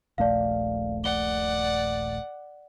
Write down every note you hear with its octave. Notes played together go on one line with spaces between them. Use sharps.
D#1 A#1 A3 D5 F5
D5 F#5 G7